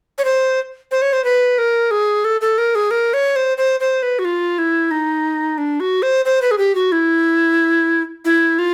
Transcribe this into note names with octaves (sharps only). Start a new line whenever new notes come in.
C#5
C5
C5
C#5
C5
B4
A#4
G#4
A4
A4
A#4
G#4
A#4
C#5
C5
C5
C5
B4
F#4
F4
E4
D#4
D4
F#4
C5
C5
B4
G#4
G4
F#4
E4
E4
F4